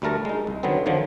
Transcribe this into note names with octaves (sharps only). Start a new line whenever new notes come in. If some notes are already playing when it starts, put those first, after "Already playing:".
D2 G3 A3 A#4 A5 A#5
G#3 D#4
C2
D3 D#3 F#3 B3 C4
F2 D3 D#3 F3 F#3